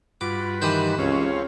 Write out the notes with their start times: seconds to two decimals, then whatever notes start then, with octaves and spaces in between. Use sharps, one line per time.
0.21 G2 F4 F#4 B4 D6
0.62 D#3 E3 G4 C5 B5
0.99 C#2 C4 C#4 C#5 F5